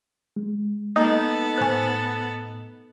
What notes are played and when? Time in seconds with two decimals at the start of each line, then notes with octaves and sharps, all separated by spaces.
0.36 G#3
0.96 A#3 B3 D#4 A4
1.58 A2 C5 G#5 F#6